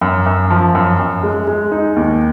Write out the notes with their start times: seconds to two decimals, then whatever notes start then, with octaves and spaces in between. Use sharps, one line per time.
0.01 F#2
0.26 F#2
0.50 F3
0.75 F#2
0.99 F#2
1.23 G#3
1.47 G#3
1.72 D#4
1.96 D#2